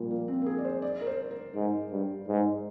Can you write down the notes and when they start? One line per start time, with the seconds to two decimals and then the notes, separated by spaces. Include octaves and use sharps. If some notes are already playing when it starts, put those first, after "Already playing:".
Already playing: A#2 F3 G3
0.11 A#3
0.28 C4
0.42 A#4
0.46 G#4
0.58 D5
0.65 C5
0.82 D5
1.01 A#4
1.07 C5
1.31 A#4
1.55 G#2
1.91 G2
2.28 G#2